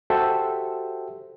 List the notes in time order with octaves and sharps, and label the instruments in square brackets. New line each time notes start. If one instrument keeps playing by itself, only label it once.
[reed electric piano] F#4 G4 A4 C5 E5 G5